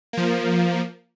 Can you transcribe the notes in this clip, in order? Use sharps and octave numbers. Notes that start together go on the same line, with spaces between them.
F3 A#3